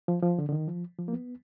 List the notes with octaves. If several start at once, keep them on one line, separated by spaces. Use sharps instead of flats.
F3
F3
D3
D3
D#3
F3
F3
A#3
B3